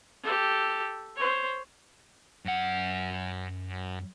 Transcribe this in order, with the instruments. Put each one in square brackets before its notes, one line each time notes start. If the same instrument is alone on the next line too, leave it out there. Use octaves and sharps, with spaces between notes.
[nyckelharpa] G4 A4
C5 C#5
[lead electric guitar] F#2 F#5